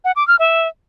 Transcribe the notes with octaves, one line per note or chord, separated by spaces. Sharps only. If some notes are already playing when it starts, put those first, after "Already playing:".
F#5
D6
F6
E5